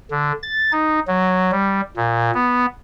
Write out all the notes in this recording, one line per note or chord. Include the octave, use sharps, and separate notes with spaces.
D3
A6
D#4
F#3
G3
A#2
B3